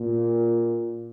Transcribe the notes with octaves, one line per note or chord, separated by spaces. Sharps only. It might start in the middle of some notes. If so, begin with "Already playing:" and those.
Already playing: A#2